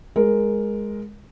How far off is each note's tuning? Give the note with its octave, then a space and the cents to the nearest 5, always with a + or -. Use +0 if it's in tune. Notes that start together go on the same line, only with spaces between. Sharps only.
G#3 +0 A#4 +5